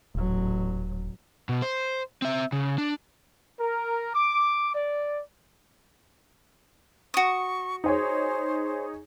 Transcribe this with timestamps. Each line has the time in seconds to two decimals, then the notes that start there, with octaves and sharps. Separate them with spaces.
0.15 D#1 A1 F#3
1.49 B2
1.62 C5
2.22 C4 E5
2.52 C#3
2.78 D4
3.60 A#4
4.14 D6
4.75 D5
7.14 F#4 C#6 D#6
7.84 D#4 G#4 C5 C#5